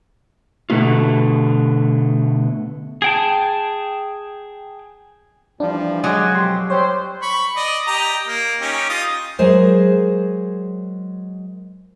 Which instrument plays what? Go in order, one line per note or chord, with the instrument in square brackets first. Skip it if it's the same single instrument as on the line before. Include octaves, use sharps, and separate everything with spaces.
[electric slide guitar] B2 D3 D#3 A3 B3 F4
[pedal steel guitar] G#4 G5 A5
[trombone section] E3 F3 G3 [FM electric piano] D4
[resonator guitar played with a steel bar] F#3 [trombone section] G#3 [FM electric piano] D6 D#6
[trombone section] F2 B2 G4 [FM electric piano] C6
[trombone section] G3 G4 C5 [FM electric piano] C#5
[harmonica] B5 C#6
D5 D#5
G4 D#5 A#5
A#3
C#4 D#4 G4
F4 D#5 D#6
[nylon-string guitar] F#3 G#3 G#4 A#4 C5